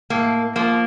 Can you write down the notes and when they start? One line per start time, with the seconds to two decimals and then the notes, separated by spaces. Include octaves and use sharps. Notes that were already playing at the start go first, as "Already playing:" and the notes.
0.10 A2 A#3
0.56 F3 A#3